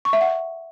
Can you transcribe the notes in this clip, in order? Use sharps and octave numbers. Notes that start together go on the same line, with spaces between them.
C#6
E5
F#5